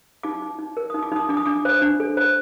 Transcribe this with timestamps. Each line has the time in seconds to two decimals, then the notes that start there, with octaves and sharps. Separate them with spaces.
0.23 D#4 D6
0.42 D#4
0.59 D#4
0.77 A#4
0.90 D#4 D#6
1.03 D6
1.12 D#4 D#6
1.29 D4 D6
1.37 D#6
1.45 D4 D6
1.65 C5
1.82 D4
2.00 A4
2.17 C5